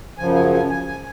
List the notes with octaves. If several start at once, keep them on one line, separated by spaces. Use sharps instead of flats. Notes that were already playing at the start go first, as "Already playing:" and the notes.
F#2 C#3 F3 G#5
G#5
G#5
G#5
G#5